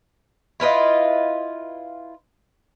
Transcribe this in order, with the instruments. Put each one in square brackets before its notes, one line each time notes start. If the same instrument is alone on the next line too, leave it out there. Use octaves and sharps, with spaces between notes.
[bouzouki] E4 F4 B4 D#5